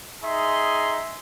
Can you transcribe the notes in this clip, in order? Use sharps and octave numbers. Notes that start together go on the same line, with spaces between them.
D#4 G#4 E5 C6